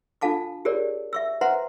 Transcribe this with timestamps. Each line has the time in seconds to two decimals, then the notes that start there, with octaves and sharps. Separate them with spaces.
0.21 D4 F4 A4 F5 A5 D6
0.65 G4 G#4 A#4 C#5 D5
1.13 E5 C#6 E6
1.41 B4 C5 E5 F#5 A#5 C6